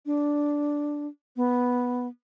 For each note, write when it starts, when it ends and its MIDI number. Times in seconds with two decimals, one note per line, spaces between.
0.06 1.07 62
1.36 2.07 59